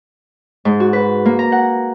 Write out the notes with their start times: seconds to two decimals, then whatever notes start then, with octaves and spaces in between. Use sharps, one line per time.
0.65 G#2
0.80 F#4
0.93 B4
1.25 A#3
1.39 A#5
1.52 F#5